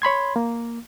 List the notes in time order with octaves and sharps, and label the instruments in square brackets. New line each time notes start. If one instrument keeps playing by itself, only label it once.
[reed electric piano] C#5 B5 C6 G#6
A#3